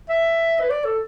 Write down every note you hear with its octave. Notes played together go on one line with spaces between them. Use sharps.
E5
B4
D5
A4